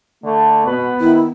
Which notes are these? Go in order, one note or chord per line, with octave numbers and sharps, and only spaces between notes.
D3 A3
B2 B3 B4
D#3 E4